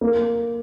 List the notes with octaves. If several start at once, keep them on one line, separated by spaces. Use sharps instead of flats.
A#3